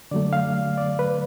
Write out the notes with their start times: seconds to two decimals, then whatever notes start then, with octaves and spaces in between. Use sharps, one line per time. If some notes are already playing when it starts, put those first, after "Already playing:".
0.11 D3 F#3 A3 D5
0.33 F5
0.78 D5
0.99 B4